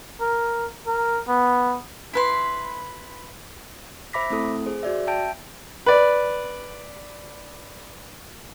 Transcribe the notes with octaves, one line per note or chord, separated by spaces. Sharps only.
A#4
A#4
B3
E4 B4 C6
C5 E5 B5 D6 A#6 B6
A3 C4 E4 A4 D#6
G#4 C5
F#4 D5 E5
E5 G5 A5 G6 D7
B4 D5